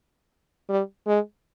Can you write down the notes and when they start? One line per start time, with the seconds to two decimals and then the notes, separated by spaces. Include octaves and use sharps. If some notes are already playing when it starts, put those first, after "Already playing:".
0.69 G3
1.07 G#3